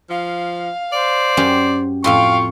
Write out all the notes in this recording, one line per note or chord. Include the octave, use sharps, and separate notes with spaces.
F3 F5
C5 D5
F#2 C#4 G4
F2 A2 F4 F5 G5 C6 C#6